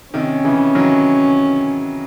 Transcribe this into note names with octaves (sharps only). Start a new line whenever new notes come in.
C3 D#3 C#4
C#3 E3
D#3 F#3